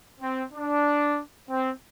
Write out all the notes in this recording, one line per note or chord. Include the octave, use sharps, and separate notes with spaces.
C4
D4
C4